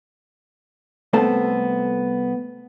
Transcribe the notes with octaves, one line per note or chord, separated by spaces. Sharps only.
C2 A3 B3 C4 A4 A5